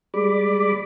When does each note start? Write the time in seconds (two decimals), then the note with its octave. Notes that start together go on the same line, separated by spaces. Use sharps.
0.14 G3 G#3 D5 B5 D6